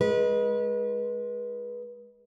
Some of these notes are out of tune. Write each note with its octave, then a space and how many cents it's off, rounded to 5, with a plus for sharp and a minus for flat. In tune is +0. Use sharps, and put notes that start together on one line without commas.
G#3 +5 B4 -30